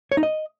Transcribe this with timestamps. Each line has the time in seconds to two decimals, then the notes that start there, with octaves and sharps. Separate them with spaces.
0.12 C#5
0.17 D#4
0.23 D#5